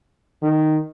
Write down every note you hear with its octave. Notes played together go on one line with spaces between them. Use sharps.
D#3